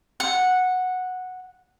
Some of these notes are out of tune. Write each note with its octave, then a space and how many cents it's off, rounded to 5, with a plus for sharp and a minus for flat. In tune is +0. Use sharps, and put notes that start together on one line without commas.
F#5 -10